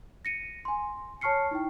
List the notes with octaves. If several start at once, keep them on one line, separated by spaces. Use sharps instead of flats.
A#6 C#7 D#7
G#5 C6
C#5 A5 C#6 F6 C7 C#7
D#4 E4 G5